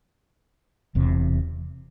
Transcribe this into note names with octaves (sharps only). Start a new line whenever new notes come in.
E1 E2 C3